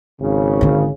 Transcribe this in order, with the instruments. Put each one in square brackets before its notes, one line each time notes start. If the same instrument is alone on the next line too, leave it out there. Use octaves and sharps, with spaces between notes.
[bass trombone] G#1 [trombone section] C#3
[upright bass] D3 C#4